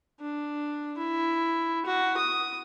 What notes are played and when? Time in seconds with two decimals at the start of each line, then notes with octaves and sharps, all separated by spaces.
0.21 D4
0.98 E4
1.86 F#4
2.17 D#6